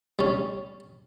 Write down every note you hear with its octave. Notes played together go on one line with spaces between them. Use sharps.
G3 C#4